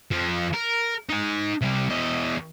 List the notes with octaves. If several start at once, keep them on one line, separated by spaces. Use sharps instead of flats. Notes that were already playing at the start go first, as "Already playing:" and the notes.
F2 F3
A#4
D#4 G#5
C3 G3
E2 D#5